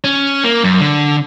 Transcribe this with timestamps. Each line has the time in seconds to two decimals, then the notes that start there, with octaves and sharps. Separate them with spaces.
0.04 C#4
0.44 A#3
0.64 F#2
0.80 D3